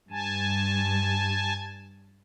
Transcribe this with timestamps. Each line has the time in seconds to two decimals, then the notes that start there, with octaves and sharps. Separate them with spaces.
0.11 G2 G#5 A5